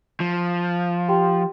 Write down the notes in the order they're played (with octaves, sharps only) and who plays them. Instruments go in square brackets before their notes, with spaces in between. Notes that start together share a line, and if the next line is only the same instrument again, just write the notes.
[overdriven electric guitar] F3
[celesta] G4 G5 C6